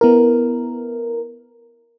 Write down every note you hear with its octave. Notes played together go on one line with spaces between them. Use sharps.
B3 E4 A#4